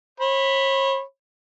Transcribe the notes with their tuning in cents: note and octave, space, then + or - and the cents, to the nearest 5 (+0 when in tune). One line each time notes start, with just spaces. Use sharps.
C#5 -40 B5 +0